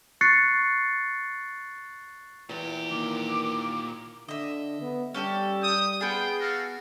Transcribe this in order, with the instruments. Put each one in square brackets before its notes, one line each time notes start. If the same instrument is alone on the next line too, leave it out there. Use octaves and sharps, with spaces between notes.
[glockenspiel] C#6 F#6 A6 C7 C#7
[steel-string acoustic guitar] E2 [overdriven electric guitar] A#2 G4
[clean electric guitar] D#3 A#3 [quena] D6
[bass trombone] D3 [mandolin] D#5 E5
[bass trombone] B3
[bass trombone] G3 [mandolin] C#4 G4 A4
[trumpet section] G5 D#6
[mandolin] B3 G#4 [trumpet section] F4 C5 G5
[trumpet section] F#4 A4 F5